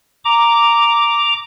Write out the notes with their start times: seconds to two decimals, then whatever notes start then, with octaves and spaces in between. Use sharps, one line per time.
0.25 A#5 D6